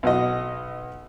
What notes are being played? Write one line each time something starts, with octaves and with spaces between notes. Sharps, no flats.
B1 F#4 D#5